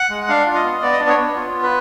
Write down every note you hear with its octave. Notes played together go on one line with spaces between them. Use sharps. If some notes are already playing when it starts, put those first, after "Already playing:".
Already playing: F#5
G#3
D4 F5
F4
D#5
B3
B3 D5
D#5
D4 D5
C#5
B3
F4
B3
B4